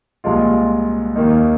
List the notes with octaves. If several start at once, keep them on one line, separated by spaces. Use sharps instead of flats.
C2 A#2 G#3 F4
D#2 D#3 A#3 D#4